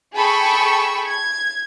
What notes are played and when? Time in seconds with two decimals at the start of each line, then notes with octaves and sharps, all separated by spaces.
0.15 G#4 A4 G5 B5 C#6 E6
1.07 G#6